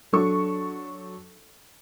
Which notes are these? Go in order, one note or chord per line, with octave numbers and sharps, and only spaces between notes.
F#3 D4 A4 C#6